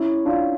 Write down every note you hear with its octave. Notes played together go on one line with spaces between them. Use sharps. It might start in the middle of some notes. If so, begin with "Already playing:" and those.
Already playing: C#4 E4
D4 F4